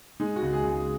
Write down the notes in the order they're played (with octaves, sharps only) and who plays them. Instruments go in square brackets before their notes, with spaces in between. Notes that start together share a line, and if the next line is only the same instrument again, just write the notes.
[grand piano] G#3 D#4
F#4
C#2
G#4
C#2
G#4